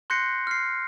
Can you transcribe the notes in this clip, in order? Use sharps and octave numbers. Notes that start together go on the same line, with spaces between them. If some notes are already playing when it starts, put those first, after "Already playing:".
C6 F#6 G6 A#6 C7 C#7
F6 C7